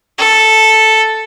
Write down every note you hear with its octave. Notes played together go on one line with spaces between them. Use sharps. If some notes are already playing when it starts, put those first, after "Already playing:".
A4